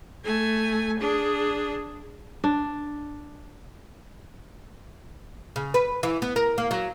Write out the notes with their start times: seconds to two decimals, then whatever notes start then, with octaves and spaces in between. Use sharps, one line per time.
0.24 A3 G#5
0.99 D4 G#4
2.44 D4
5.56 C#3
5.74 B4
6.03 E3
6.22 B3
6.36 A#4
6.58 A#3
6.71 F#3